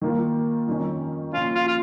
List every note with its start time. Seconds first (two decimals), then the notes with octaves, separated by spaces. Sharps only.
0.01 D#3 A#3 F4
0.67 F2 D#3 C#4
1.33 A#2 F3 C#4 F4
1.55 F4
1.68 F4